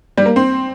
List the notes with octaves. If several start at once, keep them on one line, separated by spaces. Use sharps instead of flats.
G3
A#3
C4